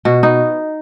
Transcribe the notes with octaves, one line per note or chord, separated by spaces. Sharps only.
B2 F#4
B3 D#4